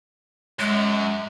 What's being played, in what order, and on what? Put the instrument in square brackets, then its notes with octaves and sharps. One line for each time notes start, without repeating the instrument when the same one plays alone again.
[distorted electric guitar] F#2 [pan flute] G#3